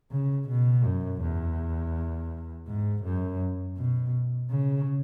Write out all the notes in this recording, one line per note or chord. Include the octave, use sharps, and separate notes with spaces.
C#3
B2
F#2
E2
G#2
F#2
B2
C#3